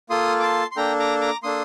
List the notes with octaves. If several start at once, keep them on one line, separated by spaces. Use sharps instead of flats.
A#3 F4 A4 C6 D#6
D6
A5 C6
C6
A#3 D4 A4 G5 A#5
A#5 D6
A#5 D6
A#3 D4 A4 C6 D#6